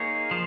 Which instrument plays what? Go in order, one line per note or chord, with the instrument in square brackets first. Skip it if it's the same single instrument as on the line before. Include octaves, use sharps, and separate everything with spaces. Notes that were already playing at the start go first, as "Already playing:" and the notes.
Already playing: [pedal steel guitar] A#3 D#4 G#4 C#5
F3